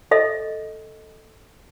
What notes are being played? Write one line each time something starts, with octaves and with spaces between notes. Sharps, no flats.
A4 D#5 E5